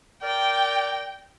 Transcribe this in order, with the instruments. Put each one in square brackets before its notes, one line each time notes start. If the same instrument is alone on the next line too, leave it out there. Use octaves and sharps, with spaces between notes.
[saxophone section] A#4 D5 [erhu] G5